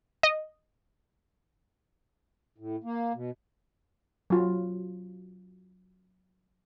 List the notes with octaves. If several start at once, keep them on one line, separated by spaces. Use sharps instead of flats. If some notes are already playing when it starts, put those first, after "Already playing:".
D#5
A2
A#3
B2
F#3 F4